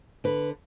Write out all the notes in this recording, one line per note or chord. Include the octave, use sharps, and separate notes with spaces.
D3 B4